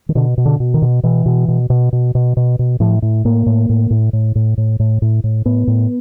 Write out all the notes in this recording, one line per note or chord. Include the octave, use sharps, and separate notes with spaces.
D#3
B2 D3
B2
D3
B2
D#3
B2
B2 E3
B2
B2
B2
B2
B2
B2
B2
A2 F3
A2
A2 A#3
A2
A2
A2
A2
A2
A2
A2
A2
A2
A2 B3
A2